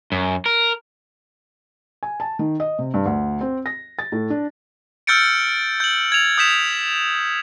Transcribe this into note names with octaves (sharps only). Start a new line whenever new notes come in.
F#2
A#4
G#5
A5
D#3
D#5
C3
G2
D2
C4
A#6
A6
A2
D4
E6 F6 G6 A6 C#7 D7
G6 F#7
G#6 F7
D#6 G6 B6 E7